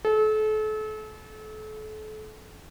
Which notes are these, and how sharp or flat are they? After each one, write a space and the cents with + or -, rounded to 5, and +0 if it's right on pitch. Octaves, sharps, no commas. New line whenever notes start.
A4 -35